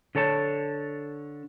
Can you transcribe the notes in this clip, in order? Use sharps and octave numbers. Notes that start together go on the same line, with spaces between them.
D3 A4 C#5 A5